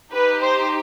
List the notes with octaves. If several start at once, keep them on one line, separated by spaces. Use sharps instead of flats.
D#4 G4 B4
C5